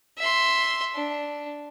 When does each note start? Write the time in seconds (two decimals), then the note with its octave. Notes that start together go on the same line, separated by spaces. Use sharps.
0.18 E5 C6
0.94 D4